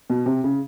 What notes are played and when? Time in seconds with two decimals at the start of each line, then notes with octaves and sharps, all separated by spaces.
0.10 B2
0.26 C3
0.44 C#3